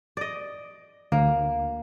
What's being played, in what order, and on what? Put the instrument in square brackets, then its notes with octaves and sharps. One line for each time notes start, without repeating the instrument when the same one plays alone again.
[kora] D5 D#5
[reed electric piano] D2 [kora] A#3